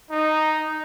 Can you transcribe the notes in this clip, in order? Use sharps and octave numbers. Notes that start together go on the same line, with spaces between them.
D#4